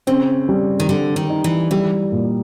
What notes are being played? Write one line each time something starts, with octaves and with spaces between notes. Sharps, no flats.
C#3 C4
G3
D#3
D3 G3
D#3
D#4
E3
E3 G3
A#2